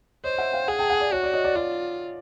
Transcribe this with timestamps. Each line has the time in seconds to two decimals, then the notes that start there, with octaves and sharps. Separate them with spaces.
0.24 C5 C#5 D#5
0.38 E5 F#5
0.53 F5 G5
0.68 G#4 F#5 G#5
0.79 G5 A5
0.90 F#5 G#5
1.00 D5
1.13 F#4 C#5
1.23 D5
1.33 C#5 D#5
1.44 D5
1.55 F4 D5